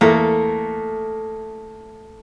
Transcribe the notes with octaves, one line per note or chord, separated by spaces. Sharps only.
E2 A3 A#3